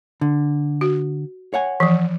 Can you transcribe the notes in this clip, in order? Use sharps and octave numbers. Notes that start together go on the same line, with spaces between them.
D3
F#4
C#5 F#5 G#5
E3 F3